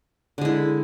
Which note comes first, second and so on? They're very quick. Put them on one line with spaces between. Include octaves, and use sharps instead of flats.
D3 G#3 E4